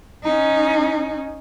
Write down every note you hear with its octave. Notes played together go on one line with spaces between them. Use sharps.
C#4 D#4